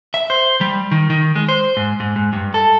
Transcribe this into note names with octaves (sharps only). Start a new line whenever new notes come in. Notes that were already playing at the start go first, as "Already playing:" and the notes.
E5
C5
G3
D#3
D#3
G#3
C5
G#2
G#2
G#2
G2
A4